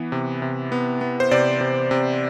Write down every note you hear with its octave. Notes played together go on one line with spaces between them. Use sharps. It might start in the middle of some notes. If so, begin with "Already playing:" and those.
Already playing: E3 B3
C3
C3
B3
B3
C5
C3 D5
C3
C3